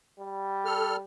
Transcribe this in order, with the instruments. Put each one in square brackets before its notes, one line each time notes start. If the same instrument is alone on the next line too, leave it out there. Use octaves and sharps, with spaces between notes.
[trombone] G3
[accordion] A4 F6